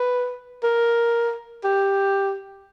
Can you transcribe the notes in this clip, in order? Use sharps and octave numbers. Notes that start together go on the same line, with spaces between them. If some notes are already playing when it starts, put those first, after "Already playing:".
Already playing: B4
A#4
G4